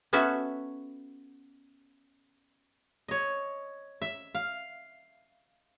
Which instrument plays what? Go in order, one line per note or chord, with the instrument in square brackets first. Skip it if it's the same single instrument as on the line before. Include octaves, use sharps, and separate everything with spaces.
[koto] B3 C#4 F#4 A4 E5
[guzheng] C#5 D#5
E5
F5